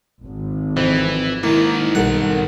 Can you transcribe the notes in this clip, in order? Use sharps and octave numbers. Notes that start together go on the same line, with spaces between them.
G#1
F2 E3
G#2 D#3 A#3 E4
B1 G3 A4 A#4 F#5